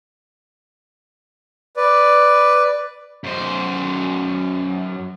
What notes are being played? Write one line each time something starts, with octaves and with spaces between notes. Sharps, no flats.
B4 D5
F#2 C5